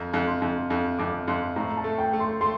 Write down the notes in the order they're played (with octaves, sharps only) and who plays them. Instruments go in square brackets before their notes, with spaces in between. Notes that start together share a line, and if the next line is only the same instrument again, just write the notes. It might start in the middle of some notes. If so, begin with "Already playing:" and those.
Already playing: [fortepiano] F2 [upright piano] A#5
[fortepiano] F2
[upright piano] C6
[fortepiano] F2
F2
[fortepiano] F2 [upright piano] D6
[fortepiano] F2 [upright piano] C6
[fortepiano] A2 [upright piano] A#5
[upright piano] A5
[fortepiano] A3
[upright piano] G5
[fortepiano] A3
[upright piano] C6
[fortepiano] A3 [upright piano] C6